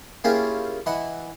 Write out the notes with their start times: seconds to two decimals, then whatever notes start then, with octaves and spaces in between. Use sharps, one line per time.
0.24 A#3 C#4 E4 F4 G4 G#4
0.86 E3 E4 D#5 F#5